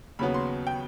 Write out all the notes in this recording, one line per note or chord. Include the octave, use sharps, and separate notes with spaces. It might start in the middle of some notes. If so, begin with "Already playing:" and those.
D#2 C#3 F#3 B3 B5
C6
G5